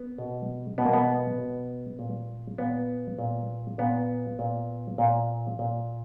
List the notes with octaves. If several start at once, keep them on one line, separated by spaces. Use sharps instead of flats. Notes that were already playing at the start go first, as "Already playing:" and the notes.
Already playing: B3
B2
B2 B3
A#3
B3
B2
A#2
A#2 B3
A#2
A#2 B3
A#2
A#2
A#2